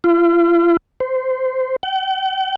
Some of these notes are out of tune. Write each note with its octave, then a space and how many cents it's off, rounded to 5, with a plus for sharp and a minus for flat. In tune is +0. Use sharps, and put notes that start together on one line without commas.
F4 -40
C5 -15
G5 -45